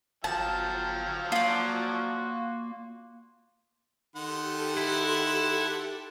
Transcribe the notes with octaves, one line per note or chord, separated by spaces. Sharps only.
G1 F3 F#3 F5 G5 A5
A#3 F4 F#4 D5
D#3 G4 A4 F#5 C6
E4